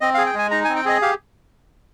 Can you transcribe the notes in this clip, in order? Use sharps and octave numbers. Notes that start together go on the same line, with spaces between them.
C4 D#5
G#4 F5
G5
G#3 G#5
D#4 A#5
G#5
C4
G5
G#4 D#5
G4 F5